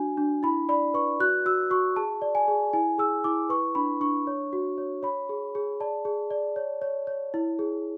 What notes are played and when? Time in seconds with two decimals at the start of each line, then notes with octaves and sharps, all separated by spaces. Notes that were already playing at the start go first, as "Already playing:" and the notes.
Already playing: D4 F#4 G#5
0.17 D4
0.43 E4 B5
0.69 D5 B5
0.94 B4 C#6
1.20 F#4 F#6
1.46 F#4 E6
1.70 F#4 C#6
1.96 G#4 A5
2.22 D5
2.35 G#5
2.48 G#4
2.73 E4 G#5
2.98 G#4 E6
3.24 E4 D6
3.49 B4 C#6
3.75 D4 B5
4.00 D4 C#6
4.27 C#5
4.53 F#4
4.78 C#5
5.03 C#5 B5
5.29 G#4
5.55 G#4
5.80 D5 A5
6.05 G#4
6.31 D5
6.56 C#5
6.82 C#5
7.07 C#5
7.34 E4
7.59 G#4